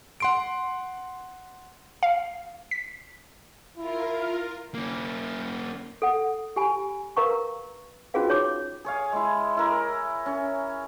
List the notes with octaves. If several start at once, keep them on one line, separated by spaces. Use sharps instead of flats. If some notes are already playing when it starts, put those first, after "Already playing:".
F#5 C6 D7
F5
B6
E4 F4 A#4
A#3 C#4
A4 F#5
G4 G#5 B5
A#4 B4 F5 A#5 C#6
C#4 F4 F#4 G#4 B4 F5
D#4 C#5 D6
G#4 C#5 F5
G#3 E4
E4 A#4
C#4